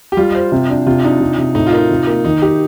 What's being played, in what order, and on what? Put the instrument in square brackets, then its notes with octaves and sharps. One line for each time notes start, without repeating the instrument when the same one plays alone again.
[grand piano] G4
[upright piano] G3 [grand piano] F4
[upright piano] C5
C3
D4
[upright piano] C3 [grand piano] F4
[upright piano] D4 [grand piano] D#4
[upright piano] C3
C3
[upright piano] A2 [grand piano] D#4
[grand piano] F4
[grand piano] D#4 [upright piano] A#4
[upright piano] C3
A#3
[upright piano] D#3 [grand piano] D#4
[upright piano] G4